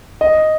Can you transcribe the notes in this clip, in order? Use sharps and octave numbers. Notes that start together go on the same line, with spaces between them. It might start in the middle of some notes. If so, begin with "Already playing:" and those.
D#5